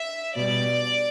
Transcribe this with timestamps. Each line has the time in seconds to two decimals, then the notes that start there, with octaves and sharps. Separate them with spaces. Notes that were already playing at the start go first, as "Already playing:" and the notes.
Already playing: E5
0.36 B2 G3 D5